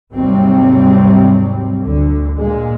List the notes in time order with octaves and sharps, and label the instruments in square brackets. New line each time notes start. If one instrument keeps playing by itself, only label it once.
[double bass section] D#2 G#2 C3 F#3 G3 C4
D2 D3
A#2 G#3